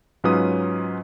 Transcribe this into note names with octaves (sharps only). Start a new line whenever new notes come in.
G#2 F#3 C#4 F4 B4 D#6